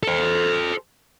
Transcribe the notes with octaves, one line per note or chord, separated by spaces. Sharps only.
A4 C5